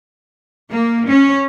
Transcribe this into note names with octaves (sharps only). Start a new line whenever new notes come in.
A#3
C#4